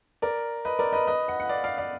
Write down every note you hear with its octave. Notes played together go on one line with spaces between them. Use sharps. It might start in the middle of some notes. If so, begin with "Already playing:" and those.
A#4 D5
B4 D#5
A#4 D5
B4 D#5
B4 D#5
D#5 F#5
F#5
D5 F5
D5 F5
D5 F5